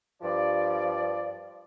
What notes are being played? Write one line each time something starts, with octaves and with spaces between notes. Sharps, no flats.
G2 F3 D5